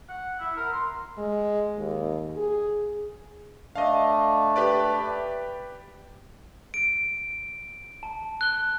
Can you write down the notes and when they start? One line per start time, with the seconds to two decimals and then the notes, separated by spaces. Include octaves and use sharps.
0.09 F#5
0.39 E4
0.57 A#4
0.72 C6
1.18 G#3
1.77 D#2
2.37 G#4
3.75 A3 D4 D#5 F5
4.56 G4 B4 D5
6.74 D7
8.03 A5
8.41 F#6 G7